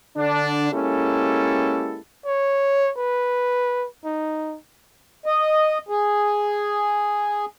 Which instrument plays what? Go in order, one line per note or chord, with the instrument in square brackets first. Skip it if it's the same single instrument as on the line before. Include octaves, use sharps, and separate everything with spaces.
[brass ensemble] D3 D4
G#3 A#3 C#4 E4 G4 A4
[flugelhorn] C#5
B4
D#4
[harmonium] D#5
G#4